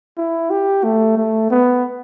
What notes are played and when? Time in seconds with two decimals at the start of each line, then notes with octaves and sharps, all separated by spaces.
0.18 E4
0.50 G4
0.84 A3
1.17 A3
1.50 B3